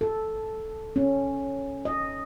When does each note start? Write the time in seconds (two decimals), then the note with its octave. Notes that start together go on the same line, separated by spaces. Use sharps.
0.01 A4
0.96 C#4
1.85 D#5